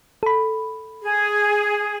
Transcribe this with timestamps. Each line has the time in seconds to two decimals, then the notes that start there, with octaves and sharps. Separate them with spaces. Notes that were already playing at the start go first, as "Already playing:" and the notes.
0.23 A4 B5
1.02 G#4